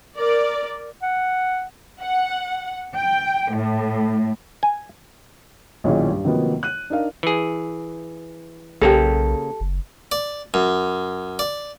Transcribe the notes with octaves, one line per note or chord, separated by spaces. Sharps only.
A#4 D5
F#5
F#5
G5
A2
G#5
B1 A#2 D#3 C#4 E4 G#4
G2
C3 D#3 F3 F#3 A#3 B3
F#6 D#7
D4 D#4 A#4 F5
E3 G#4
B1 C#3 A#3 G4 A4
F#1
D5
F#2
D5